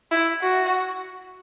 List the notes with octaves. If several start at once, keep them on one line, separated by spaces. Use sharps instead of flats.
E4
F#4